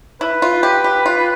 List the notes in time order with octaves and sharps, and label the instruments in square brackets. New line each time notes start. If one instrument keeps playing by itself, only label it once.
[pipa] E4 [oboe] B4
[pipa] F4
G4
G4
F4